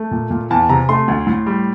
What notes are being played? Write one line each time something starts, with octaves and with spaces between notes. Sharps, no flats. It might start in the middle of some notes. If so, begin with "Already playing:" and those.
Already playing: A3
A#2
A#2
E2 A5
C3 A#5
A3 C6
D2
A2
G3